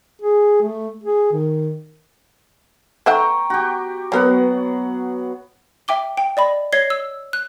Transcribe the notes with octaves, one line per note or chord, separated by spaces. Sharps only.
G#4
A3
G#4
D#3
A3 E5 F#5 G5 A#5 C#6
F#4 G4
F#3 G3 B3 A#4 F#5
E5 G5 D6 G7
G5
D5 D#5 B5
C#5 D#5 G#6 C7 G7
E6
F#6